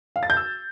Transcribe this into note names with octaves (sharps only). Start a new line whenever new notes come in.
F5
A6
G6
E6